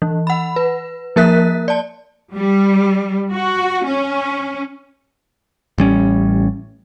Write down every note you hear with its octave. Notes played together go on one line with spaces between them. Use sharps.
E3
F#5 B5
B4
F3 A#3 A#4 E5 F#6 B6
D5 A5
G3
F#4
C#4
A1 G3 C#4